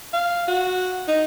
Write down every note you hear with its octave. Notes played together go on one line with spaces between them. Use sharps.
F5
F#4
D#4